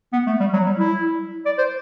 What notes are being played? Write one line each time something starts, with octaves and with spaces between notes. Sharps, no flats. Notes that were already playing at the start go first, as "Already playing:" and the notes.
B3
A3
G3
F#3
G3
E4
D5
C5